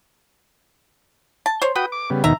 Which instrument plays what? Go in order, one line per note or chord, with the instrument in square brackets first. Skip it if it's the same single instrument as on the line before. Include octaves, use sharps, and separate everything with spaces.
[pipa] A5
C5 C#5
[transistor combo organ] F#4 G5 D#6 [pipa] B4
[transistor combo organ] D6
C#3 G3 B3
[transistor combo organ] D#2 B2 D#3 [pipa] E5 A#5